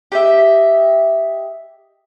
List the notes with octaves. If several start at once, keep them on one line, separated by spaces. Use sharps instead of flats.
G4 D#5 E5